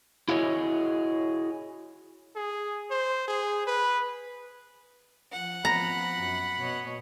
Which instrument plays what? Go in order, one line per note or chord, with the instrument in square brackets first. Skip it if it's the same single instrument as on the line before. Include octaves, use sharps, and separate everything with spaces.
[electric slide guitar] E4 F#4 G#4 C#5 D#5
[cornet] G#4
C5
G#4
B4
[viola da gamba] F3 [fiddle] F#5
[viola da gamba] F3 B3 C4 [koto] A#5 [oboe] B5
[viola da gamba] F#2
B2 C#5 D#5